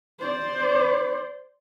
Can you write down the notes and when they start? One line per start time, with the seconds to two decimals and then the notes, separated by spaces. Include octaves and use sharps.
0.19 C5 D5